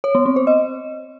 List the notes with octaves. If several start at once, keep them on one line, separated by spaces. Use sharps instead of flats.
C#5
B3
C4
C5
D#5